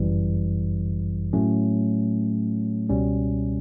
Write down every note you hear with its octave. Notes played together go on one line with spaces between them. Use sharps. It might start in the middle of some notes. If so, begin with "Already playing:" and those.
Already playing: G1 F#2 E3 G3
A2 F#3 A3 C#4
C#2 B2 G3 C#4